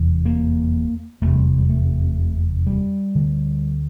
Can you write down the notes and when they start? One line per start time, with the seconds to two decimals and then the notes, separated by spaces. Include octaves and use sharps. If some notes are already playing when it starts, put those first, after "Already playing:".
Already playing: F1 E2 C3
0.25 A#3
1.21 F1 E2 C3 A3
1.34 G3
1.58 G3
1.69 A3
2.67 G3
3.15 D2 D3